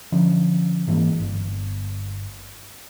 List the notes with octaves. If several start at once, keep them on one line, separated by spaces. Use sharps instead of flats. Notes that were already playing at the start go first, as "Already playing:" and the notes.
D3 F3 C#4
G#2 E3 G#3 A#3
G1